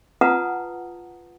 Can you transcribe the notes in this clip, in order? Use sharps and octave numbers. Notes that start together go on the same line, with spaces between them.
F4 B4 F#5 A5 A#5 D#6